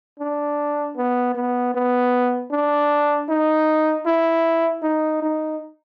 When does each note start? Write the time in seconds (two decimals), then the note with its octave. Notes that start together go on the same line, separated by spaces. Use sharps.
0.20 D4
0.97 B3
1.35 B3
1.75 B3
2.51 D4
3.29 D#4
4.06 E4
4.83 D#4
5.22 D#4